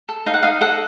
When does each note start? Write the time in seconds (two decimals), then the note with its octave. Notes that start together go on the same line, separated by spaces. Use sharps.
0.09 A4
0.26 D#4 F5
0.34 F#5
0.43 D#4 F5
0.61 A4 F#5